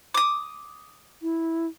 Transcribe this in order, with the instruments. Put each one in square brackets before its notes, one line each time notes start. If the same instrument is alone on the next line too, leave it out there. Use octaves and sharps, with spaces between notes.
[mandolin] D6 D#6
[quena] E4